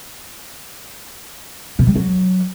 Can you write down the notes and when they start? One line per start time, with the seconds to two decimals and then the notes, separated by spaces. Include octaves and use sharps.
1.79 B2
1.87 G3
1.96 F#3